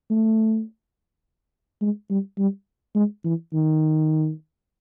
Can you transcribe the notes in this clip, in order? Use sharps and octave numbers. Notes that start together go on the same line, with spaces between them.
A3
G#3
G3
G3
G#3
E3
D#3